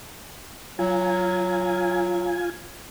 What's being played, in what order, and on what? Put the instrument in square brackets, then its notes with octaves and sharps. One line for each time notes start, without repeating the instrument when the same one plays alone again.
[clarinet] F#3 [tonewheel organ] F4 G#5